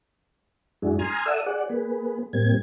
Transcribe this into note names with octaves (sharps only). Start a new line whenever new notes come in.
F#2 G#3 D4 E4 F#4 G#4
G#5 A#5 C6 D#6 F6 G#6
A4 D5 E5 F#5 D#6 E6
G#4 D5 F#5
A#3 G#4 B4
A2 G3 A#3 C4 G#6